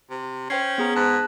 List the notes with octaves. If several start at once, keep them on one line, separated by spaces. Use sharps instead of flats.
C3
C#4 C5 G5 C7
B3 G#4 A#5
G#2 A5 F#6